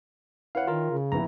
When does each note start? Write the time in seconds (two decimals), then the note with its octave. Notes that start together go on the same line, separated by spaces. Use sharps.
0.55 E4 B4 C#5 F5 F#5
0.67 D#3 F4 A#4
0.91 C#3
1.12 A#1 B3 E4 A#5